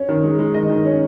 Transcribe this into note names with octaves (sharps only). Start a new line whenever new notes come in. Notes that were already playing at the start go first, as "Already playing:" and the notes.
Already playing: C#4 C#5
D#3
G#3
G#3
D#3 D#5
D#3
C#4